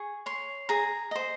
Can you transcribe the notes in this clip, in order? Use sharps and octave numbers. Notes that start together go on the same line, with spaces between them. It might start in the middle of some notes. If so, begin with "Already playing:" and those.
Already playing: G#4 C#6
C#5 C6
G#4 A#5
C5 D#5